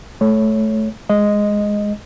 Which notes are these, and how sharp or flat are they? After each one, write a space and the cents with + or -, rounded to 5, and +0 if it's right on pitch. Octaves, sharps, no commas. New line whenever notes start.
A3 -20 C#5 +0
G#3 +0 D#5 +0